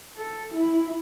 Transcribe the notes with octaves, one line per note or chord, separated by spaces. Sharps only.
A4
E4